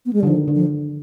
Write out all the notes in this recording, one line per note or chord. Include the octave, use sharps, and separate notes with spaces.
B3
G#3
D3 G3
D#3 F3
D3
F3